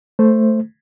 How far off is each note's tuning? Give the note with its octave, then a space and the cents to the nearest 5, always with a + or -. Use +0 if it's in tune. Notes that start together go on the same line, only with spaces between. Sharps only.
A3 +0 C5 +0